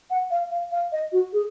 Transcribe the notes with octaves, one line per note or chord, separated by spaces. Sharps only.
F#5
F5
F5
F5
D#5
F#4
G#4